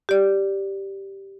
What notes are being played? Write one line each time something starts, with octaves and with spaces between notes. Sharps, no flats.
G4 D5